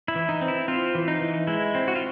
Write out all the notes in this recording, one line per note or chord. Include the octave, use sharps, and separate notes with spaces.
E4
E3
D#4
C4
E4
C4 F4
E3
D#4
E3
G#3 E4
C4
F#4
F4